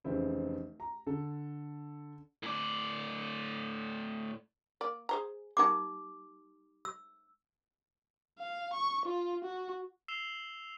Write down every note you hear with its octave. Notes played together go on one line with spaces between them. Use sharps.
F1 C#3 E3 C4 E4
A#5
D3 A4
A2 D5
A#3 D5
G#4 C5 A#5
G3 A#3 D#4 F#4 D6
E6
F5
C#6
F4
F#4
E6 C7 E7 F7 G7